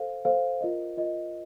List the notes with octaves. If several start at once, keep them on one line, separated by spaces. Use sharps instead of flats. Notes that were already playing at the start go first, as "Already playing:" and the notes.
Already playing: A4 C5 F5
A4 C5 F5
F4 A#4 D#5
F4 A#4 D#5